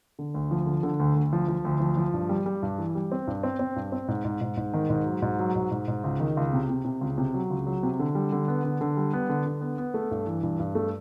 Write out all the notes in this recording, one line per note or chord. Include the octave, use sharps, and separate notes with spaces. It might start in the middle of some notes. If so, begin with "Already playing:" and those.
D3
D2
F3
D3
D3
D2
D2
F3
F3
D2
F3
F3
G2
G3
G3
G2
E3
G3
C4
G2
C4
C4
G2
C4
G#2
G#2
G#2
G#2
D#3
G#2
F#3
G#2
F#3
G#2
G#2
G#2
C#2
D#3
C#2
C3
C3
C3
C#2
C3
F#3
C#2
F#3
C3
D3
G3
D3
B3
D3
D3
G3
B3
D3
D3
B3
B3
A3
G2
E3
G2
G2
A3